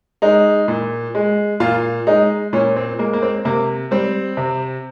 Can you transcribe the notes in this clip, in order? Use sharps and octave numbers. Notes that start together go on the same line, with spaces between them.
G#3 D#4
A#2
G#3
A#2 F4
G#3 D#4
A#2 C#4
C4
G#3 A#3
A#3
C4
C3 A#3
G3 C4
C3